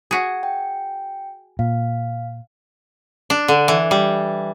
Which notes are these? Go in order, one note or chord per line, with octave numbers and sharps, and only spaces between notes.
F#4 G#4
G5
A#2 F5
D4
D3
E3
G3